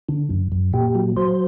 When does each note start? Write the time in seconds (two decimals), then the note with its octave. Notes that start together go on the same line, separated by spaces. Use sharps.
0.09 D3
0.30 F#2
0.52 F#2
0.73 A#2 G4
0.95 F#3
1.17 F#3 C5